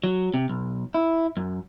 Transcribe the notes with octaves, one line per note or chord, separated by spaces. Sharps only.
F#3
C3
B1
E4
F#2